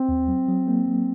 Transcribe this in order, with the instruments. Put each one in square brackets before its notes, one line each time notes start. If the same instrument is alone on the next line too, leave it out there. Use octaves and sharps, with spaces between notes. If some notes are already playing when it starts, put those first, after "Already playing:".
Already playing: [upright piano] C4
[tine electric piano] D#2
F#3
F#3
A#3
F#3